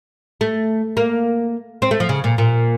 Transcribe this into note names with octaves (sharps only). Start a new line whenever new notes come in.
A3
A#3
C4
A3
F3
C#3
A#2
A#2